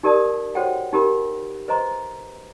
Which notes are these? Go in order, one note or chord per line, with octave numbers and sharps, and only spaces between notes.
D#4 G4 A#4 D5 A5 D#6
F#4 A4 C5 C#5 F#5 G5
D#4 G4 A#4 B5
B4 C5 D#5 A#5 C6